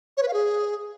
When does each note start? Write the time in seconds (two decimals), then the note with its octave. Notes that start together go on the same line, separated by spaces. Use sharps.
0.17 C#5
0.23 B4
0.28 F5
0.33 G#4